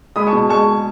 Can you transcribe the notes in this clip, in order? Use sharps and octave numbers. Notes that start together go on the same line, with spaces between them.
G#3 B5 D#6
A5 C#6
B2
G#3 A5 C#6
G#3